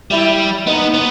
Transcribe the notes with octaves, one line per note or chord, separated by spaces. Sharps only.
G3 E4
B3 D#4
B3